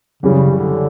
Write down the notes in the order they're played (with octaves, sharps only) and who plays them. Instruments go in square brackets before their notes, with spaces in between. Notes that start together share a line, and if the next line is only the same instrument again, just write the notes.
[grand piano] F#2 E3 G3 [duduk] C#3
[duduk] C#3
D3